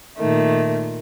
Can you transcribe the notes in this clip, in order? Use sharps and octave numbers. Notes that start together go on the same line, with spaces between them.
A#2 D#3 A3